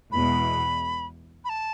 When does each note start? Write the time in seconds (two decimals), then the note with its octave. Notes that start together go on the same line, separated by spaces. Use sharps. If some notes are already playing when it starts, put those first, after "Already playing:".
0.11 E2 B2 G#3 B5
1.45 B5
1.49 A5